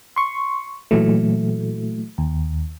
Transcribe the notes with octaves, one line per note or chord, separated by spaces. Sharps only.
C6 C#6
A#2 E3 F#3 A3
D#2